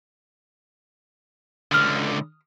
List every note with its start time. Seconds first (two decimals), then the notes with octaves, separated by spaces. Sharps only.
1.72 C#2 D3 D#6 F6